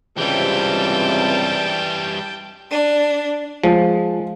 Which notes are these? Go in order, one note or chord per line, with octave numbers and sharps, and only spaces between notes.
C#2 G2 C3 E3 G3 G5 A5
D4
F3 G#3